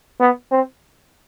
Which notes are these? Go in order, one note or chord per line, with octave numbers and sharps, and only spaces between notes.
B3
C4